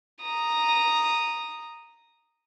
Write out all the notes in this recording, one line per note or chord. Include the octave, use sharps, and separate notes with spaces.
A#5 D#6